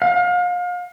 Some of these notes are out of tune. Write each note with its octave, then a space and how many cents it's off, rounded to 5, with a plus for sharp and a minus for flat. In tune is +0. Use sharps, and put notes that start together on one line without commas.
F5 +35